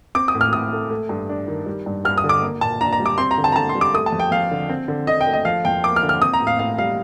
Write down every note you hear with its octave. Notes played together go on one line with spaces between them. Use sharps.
C4 D6
D#6
A2
F6
A2 D#6
A3
A3
G2
D4
D#3
G3
G2
G2 F6
D#6
D3
D6
A#3
A#2 A5
D4 A#5
A#5
G3
D6
C4 C6
A#5
D3
A5
A#5
D3 A5
C6
G3
D6
A3 D#6
A5
F2
G5
F2 F5
D3
C4
D3
D3 D#5
G5
A3
D#5
F3 F5
F2 G5
A#3 D6
F6
D3
F6
C4 D#6
A#5
A2
F5
A2 F5
G3 F5